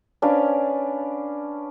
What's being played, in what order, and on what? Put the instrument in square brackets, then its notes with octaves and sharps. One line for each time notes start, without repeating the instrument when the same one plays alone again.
[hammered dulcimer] C#4 D4 B4 F5